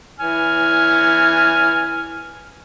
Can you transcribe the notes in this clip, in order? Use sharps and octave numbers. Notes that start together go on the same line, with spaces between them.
E3 G#5 F6